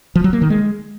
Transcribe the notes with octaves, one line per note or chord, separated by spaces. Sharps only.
F3
F#3
A#3
D#3
G#3